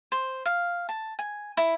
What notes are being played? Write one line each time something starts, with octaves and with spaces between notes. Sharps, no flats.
C5
F5
A5
G#5
E4